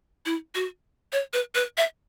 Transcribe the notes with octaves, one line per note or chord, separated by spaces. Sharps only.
E4
F#4
C#5
B4
B4
E5